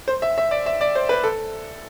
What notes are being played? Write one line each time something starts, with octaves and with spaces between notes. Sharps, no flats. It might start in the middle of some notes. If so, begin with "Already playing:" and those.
C5
E5
E5
D5
E5
D5
C5
B4
A4